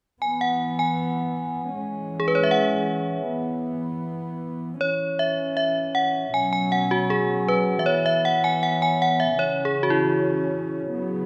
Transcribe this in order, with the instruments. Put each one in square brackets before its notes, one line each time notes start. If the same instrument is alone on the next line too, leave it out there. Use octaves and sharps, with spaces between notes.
[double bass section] E3 B3 [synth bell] G#5
[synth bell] F#5
G#5
[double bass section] E3 G#3 C#4
[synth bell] G#4
B4
C#5
E5
F#5
[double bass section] E3 B3
[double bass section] E3 C#4 [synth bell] C#5
[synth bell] E5
E5
F#5
[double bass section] B2 F#3 C#4 [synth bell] G#5
[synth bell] G#5
F#5
F#4
G#4
B4
E5
[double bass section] E3 B3 [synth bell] C#5
[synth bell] E5
F#5
G#5
F#5
G#5
F#5
E5
[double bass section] C#3 E3 C#4 [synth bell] C#5
[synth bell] G#4
F#4
E4
[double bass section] C#3 F#3 B3